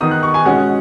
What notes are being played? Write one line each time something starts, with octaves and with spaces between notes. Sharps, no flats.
D#3 B3 D#4 D#6
F#6
C#6
G#5
B2 G#3 C#4 F#5